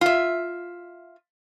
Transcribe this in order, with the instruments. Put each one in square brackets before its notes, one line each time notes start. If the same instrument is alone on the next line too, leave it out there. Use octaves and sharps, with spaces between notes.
[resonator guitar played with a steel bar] F4 E5